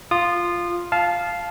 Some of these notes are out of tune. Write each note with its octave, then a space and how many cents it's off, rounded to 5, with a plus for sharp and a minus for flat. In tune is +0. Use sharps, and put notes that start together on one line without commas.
F4 +0 D#6 -30
F5 +0 A5 -20